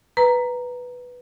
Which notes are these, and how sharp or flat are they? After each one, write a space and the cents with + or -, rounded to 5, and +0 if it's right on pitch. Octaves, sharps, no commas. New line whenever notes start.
B4 +0 A#5 +0